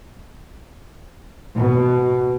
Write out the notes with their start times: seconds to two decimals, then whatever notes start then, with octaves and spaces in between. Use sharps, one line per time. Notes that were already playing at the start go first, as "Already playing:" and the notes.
1.56 B2